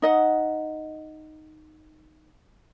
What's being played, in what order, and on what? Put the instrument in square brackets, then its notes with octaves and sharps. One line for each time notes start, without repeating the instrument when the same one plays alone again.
[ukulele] D#4 D#5 F#5